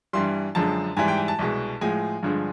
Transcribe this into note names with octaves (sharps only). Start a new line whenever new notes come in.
G2 E3 G3 C6
F#2 D3 F3 G#3 A5
G#2 E3 G3 G#5
G5
G#5
A5
C2 B2 G#3
A2 F3 G#3 G#5
G2 D3 F3 G#3